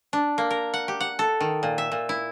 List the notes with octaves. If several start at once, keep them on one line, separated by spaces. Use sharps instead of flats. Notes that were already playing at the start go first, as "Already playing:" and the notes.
D4
A#3
A#4
F#5
G4
F#5
A4
D#3
A#2
E5
A#2
E4